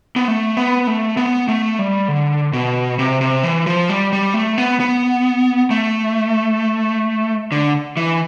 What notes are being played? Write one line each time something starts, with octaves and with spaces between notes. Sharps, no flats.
B3
A3
B3
A3
B3
A3
G3
D3
B2
C3
C3
E3
F3
G3
G3
A3
B3
B3
A3
D3
E3